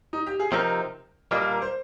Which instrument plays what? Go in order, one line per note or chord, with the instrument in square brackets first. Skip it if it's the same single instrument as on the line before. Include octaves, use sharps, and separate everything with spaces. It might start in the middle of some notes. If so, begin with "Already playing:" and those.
[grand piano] D#4
G4
G#4
[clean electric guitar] C3 F3 C4 D#4 [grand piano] A#4
[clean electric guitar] A#2 G3 A#3 D4 [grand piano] D#5
[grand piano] F5
A#4
C5